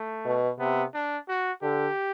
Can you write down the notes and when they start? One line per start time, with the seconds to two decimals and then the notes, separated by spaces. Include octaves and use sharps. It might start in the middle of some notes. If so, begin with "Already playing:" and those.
Already playing: A3
0.25 B2
0.59 C3 B3
0.94 D4
1.28 F#4
1.62 D3 G4